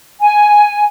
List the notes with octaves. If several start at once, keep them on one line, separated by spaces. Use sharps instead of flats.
G#5